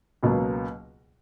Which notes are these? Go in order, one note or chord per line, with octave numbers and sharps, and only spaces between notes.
C#2 B2 F#3 A#3